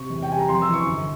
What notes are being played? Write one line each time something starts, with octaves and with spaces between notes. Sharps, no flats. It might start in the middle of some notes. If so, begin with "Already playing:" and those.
Already playing: C3 C#6
E2
G5
G3 G#5
A#5
F2 C6
E6
E3
C#6
G1